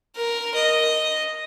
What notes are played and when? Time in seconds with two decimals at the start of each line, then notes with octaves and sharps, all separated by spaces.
0.17 A#4
0.55 D#5